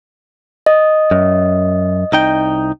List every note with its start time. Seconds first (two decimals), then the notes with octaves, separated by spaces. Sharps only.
0.66 D#5
1.11 F#2
2.12 C2 D#4 G5